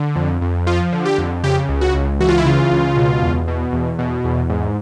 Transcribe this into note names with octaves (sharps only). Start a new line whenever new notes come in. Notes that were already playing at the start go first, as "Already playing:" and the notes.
Already playing: D3
F2
F2
F3 F4
D3
G4
F2
C#3 G4
C#2
F#4
C#2
E3 F#4
F4
E4
C#3 F4
C#2
B2
E2
B2
E2
B2
E2
G#2